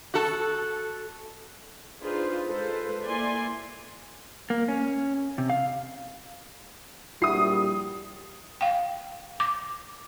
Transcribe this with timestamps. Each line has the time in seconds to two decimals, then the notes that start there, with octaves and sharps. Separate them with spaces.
0.14 F#4 A4
1.99 D4 D#4 F4 G#4 B4 C5
2.45 G#3 F4 A4 B4 C5
3.04 A#3 E4 D5 G#5 C6
4.50 A#3
4.68 C#4
5.38 C3
5.50 F5
7.22 A#1 G3 E4 F#4 D#6 C7
8.61 F5 G5
9.40 D6